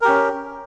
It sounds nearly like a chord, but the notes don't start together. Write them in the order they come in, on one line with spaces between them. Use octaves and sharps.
A#4 G4 C#4